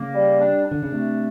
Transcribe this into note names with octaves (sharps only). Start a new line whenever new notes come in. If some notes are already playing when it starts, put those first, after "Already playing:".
Already playing: C#3 A#3
G3
D4
D4
D3
C#3
C3 A3